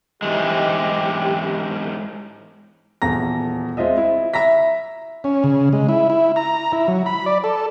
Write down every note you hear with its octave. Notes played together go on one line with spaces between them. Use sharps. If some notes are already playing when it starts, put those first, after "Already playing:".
G#2 E3 G#3 G4
D#1 E2 A4 A#5 A#6
G#3 C4 F4 D#5 E5
E4
E5 A#5 B5 A#6 B6
C#4
C#3
G#3
E4
E4
A#5
E4
F#3
B5
D5
A4